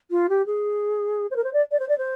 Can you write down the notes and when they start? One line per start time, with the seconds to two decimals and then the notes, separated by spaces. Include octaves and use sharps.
0.10 F4
0.29 G4
0.46 G#4
1.31 C5
1.36 A#4
1.44 C5
1.53 D5
1.71 D5
1.79 C5
1.88 D5
1.98 C5